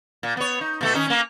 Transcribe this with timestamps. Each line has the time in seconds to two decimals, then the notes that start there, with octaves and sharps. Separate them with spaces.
0.23 A#2
0.37 B3 C#5
0.61 D#4
0.81 B2 A3 A4
0.94 D#3 C#4 D#4
1.07 A#3 C#4